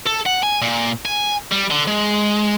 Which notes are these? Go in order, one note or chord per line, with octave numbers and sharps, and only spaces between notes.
A4
F#5
G#5
A#2
G#5
G3
D3
G#3